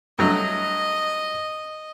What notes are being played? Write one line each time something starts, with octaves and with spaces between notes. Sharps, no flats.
G2 F#3 A3 D#5